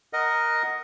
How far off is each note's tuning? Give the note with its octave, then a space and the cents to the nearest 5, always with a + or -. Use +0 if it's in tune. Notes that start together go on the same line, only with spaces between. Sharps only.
A#4 +0 D#5 +0 F#5 +10